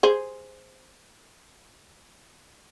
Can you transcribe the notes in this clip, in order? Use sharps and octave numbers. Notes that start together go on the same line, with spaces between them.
G#4 C5